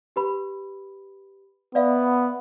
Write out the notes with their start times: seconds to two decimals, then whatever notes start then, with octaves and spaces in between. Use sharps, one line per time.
0.16 G4 B4 B5
1.75 B3 D5 E5 F5